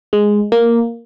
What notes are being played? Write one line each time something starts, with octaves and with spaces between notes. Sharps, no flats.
G#3
A#3